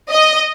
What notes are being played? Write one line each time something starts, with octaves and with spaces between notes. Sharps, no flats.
D#5